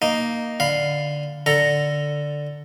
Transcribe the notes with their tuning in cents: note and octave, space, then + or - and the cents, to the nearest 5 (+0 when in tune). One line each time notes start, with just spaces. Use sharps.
A#3 +0 D#4 +0
D3 +0 F5 +0 B5 +15
D3 +0 A4 +15 A#5 +0